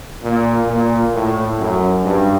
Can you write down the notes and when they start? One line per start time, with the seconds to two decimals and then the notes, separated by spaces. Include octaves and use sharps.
0.23 A#2
0.68 A#2
1.14 A2
1.60 F#2
2.04 G2